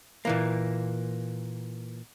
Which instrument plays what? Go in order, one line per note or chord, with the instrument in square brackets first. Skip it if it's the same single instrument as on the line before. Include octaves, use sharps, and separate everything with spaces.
[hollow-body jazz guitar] A#2 E3 A#3